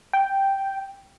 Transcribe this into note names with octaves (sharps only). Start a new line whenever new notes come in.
G5